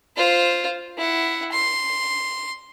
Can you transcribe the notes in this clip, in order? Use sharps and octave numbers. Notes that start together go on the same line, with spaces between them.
F4 C5
E4 F#5
C6